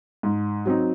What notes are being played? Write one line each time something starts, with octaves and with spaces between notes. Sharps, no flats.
G#2
F#3 C4 D#4